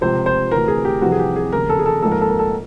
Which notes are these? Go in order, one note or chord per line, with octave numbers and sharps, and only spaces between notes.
C#2 C3 F3 C5
C5
D2 C3 E3 A#4
G#4
G4
F2 C3 E3 G3 F#4
G#4
G4
G#4
F1 D#2 C#3 A#4
A4
G#4
A4
A#1 G#2 F3 A#3 A4
A#4
A4
A#4
A4